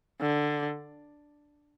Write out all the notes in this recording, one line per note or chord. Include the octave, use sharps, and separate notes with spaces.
D3